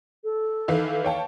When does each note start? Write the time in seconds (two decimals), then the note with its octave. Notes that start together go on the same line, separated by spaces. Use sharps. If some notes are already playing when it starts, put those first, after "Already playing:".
0.24 A4
0.68 D#3 E3 F5
1.05 C#5 F5 G5 A5